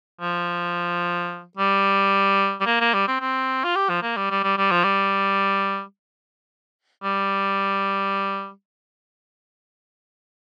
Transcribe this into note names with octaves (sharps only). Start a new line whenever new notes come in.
F3
G3
G3
A#3
A#3
G3
C4
C4
F4
G4
F3
A#3
G3
G3
G3
G3
F3
G3
G3